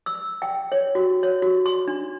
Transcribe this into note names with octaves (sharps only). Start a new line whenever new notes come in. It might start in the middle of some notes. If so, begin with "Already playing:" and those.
E6
G5
C#5
F#4
C#5
F#4
C6
D4